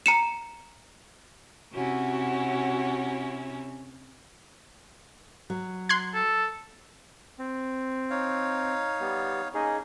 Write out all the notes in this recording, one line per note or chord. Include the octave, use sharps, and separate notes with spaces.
A#5 C#7 E7
C3 C#4 E4 F#4
F#3
C6 F#6 G#6
A4
C4
D#4 C#5 F5
G3 B3
A#3 C#4 D#4 G#4